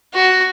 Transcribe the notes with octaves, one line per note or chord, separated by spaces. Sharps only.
F#4